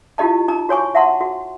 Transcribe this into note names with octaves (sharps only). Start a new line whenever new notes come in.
E4 F4 G4 D#5 A5
D#4 A#5
F#4 C#5 G#5 C#6
E5 F#5 A5 C6
F#4